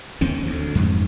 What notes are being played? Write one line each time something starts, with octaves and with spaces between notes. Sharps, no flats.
D#2 D#3 C4 C#4
D2
F2 G#2